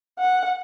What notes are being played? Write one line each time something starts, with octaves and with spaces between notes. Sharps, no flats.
F#5